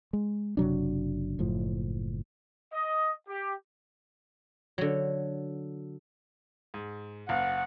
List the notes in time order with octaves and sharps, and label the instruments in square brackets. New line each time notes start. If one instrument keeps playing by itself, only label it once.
[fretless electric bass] G#3
F#1 C3 F#3 D4
F#1 A2 F3
[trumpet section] D#5
G4
[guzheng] D3 F#3
[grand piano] G#2
[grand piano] F#1 F5 [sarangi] F#5